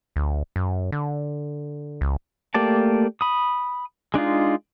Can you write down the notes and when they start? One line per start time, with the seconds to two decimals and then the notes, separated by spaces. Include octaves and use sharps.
0.16 D2
0.56 F#2
0.92 D3
2.01 C#2
2.54 A3 A#3 G4 D5 A5
3.21 B5 D#6
4.14 G#3 D4 D#4 F4